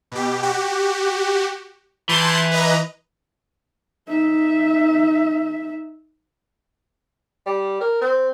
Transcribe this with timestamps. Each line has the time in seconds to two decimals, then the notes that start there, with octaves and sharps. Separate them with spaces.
0.12 B2 G4
0.43 F#4 G4
2.09 E3 A5 C6 G6
2.51 B4 D#5 A#5
4.07 D#4 E5
7.46 G3
7.81 A#4
8.02 C4